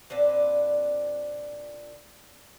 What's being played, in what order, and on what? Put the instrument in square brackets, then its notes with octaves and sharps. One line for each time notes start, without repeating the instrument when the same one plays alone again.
[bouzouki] A#2 C4 D4 B4